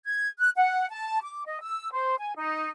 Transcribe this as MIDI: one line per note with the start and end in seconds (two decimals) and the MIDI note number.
0.06 0.28 92
0.39 0.50 90
0.56 0.87 78
0.91 1.19 81
1.23 1.43 86
1.46 1.58 75
1.62 1.90 88
1.93 2.16 72
2.18 2.33 80
2.37 2.69 63